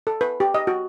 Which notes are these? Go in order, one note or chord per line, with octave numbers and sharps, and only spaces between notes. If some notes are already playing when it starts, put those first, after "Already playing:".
A4
B4
G4
D#5
F#4